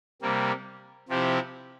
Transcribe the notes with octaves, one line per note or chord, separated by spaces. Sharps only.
C3 G3 A#3
C3 F3 C4 E4 G4